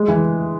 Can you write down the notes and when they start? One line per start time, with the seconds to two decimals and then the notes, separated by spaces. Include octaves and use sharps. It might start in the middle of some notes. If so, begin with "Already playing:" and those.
Already playing: G#3
0.08 E3